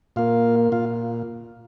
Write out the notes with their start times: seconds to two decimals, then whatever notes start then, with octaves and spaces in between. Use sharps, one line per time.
0.16 A#2 A#3 F4 F5
0.72 A#2 F4 F5